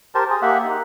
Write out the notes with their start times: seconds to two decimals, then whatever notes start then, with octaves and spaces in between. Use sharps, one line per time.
0.15 G4 A#4 C5 A5
0.30 G#4
0.42 A#3 G4 E5 F#5
0.64 D#4